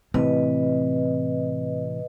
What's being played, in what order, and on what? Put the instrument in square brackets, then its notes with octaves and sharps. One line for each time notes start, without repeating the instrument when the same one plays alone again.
[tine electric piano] A2 C3 E3 [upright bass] C4 [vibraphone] B4 D#5